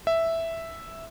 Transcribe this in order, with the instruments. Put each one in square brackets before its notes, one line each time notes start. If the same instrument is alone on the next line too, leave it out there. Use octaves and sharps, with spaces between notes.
[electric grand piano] E5